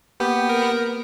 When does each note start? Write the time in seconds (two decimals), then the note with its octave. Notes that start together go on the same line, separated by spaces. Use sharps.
0.20 A#3 B3 G4
0.49 A#4